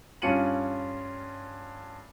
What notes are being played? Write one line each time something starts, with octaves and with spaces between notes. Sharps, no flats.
G2 C#4 F4 C#7 D#7 F#7